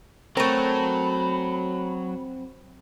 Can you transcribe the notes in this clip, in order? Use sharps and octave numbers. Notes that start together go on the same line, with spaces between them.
F#3 A3 C4 A#4 B5